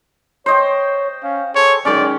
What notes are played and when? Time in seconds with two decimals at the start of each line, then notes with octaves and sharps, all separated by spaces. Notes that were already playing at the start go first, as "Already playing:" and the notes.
0.46 C5 C#5 D#5 G5
1.23 C#4 F5
1.55 G#4 A4 C#5 C6
1.85 D3 D#3 F#3 G#3 C#4 D5